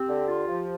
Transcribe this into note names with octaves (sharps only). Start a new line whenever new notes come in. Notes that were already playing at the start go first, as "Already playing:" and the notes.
Already playing: C4 G4
D3
F4
F3